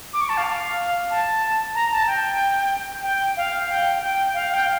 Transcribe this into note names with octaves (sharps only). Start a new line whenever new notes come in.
D6
C#6
A5
F5
A5
A#5
A5
G5
G5
F5
G5
G5
F5
G5